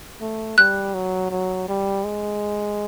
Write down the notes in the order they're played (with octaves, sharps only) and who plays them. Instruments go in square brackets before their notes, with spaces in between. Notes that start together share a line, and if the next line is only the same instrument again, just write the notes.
[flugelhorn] A3
[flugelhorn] G3 [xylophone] F#6
[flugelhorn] F#3
F#3
G3
G#3